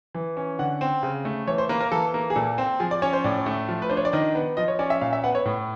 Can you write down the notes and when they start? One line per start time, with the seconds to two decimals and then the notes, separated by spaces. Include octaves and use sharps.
0.15 E3
0.37 C#4
0.59 D3 F#5
0.81 C4
1.03 C#3
1.25 A3
1.47 E3 C#5
1.58 C5
1.69 A#3 B4
1.81 A#4
1.92 E3 A4
2.14 A#3
2.30 G#4
2.36 A#2 A4
2.58 C4
2.80 F3 G#4
2.91 D5
3.02 C#4 C#5
3.13 C5
3.24 A2 D5
3.46 A3
3.68 F3
3.82 B4
3.90 D4 C5
3.97 C#5
4.05 D5
4.13 D#3 D#5
4.35 B3
4.57 F3 D#5
4.68 C#5
4.79 C#4 D5
4.90 E5
5.01 A#2 F5
5.13 E5
5.24 B3 F#5
5.35 C#5
5.45 A2